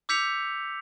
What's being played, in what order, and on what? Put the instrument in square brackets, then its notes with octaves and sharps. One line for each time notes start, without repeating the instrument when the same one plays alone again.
[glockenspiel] D6 E6 G6 B6 C#7 F7